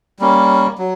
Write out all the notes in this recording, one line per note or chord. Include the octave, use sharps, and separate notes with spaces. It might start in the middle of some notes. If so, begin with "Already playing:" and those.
G3 A#3 C#4
F#3